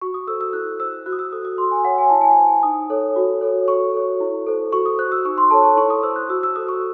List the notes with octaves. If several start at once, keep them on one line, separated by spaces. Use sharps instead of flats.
F#4 C#6
D#6
A4 C5 E6
E6
E4 F#6
C5 E6
F#4 F#6
D#6
E6
A4 C5 D#6
D#6
F#4 C6
G#5
C#5 F#5
G#5
E4 A5
G#5
C5
D#4 D#6
A4 C#5
F#4
A4 C#5
F#4 C#6
A4 C#5
E4
A4 C5
F#4 C#6
D#6
C5 F#6
E6
D#4 C#6
C6
A4 C#5 A5
C#6
E4 C#6
D#6
C5 E6
F#6
F#4 E6
E6
A4 C5 D#6
C#6